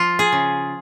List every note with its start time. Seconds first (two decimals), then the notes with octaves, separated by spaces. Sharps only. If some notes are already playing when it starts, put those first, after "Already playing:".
Already playing: F3 F4
0.19 G#4
0.32 C#3